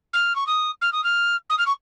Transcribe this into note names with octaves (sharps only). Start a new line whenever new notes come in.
F6
C#6
D#6
F6
D#6
F6
D#6
F6
C#6